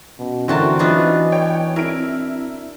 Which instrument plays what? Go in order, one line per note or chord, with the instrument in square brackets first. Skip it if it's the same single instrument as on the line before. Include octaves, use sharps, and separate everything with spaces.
[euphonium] B2 [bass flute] C#4
[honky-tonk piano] D3 E3 A#4 [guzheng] C4 F#4 A5 [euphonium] E4
[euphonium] E3 [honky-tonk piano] F#3 F4 [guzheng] B3 D4 F#4 [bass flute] D#5
[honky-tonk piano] C#5 G5
[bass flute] C4 [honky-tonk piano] E4 D7 [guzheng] A#4